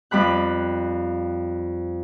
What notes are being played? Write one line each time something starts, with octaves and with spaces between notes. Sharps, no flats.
F2 G3 B5 F#6